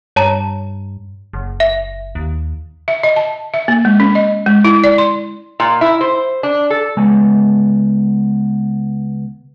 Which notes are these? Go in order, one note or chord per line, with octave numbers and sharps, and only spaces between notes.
G2 C#5 A5 A#5
F#1
E5
D#2
E5
D#5
A5
E5
A#3
G#3
C#4
D#5
G#3
E4
D5
C6
A#2
E4
C5
D4
A4
C#2 G#3 B3 G#5 A5